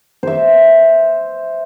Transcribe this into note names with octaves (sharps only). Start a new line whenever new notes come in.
C5 E5